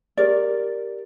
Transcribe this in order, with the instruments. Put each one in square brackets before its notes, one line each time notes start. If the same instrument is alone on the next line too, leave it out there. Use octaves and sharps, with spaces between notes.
[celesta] G4 [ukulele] A#4 D5